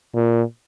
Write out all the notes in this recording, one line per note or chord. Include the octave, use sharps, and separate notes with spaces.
A#2